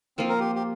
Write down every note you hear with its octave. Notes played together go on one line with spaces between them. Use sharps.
F3 A#3 C4 F4
A#4
G4
G4